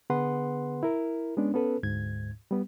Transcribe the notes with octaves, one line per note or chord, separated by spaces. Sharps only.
D3 B3 G#4 B4 F#5 C6
E4 A#4
G#3 B3 C#4 D4
B3 C#4 A4 B4
D2 G#2 G#6
G3 B3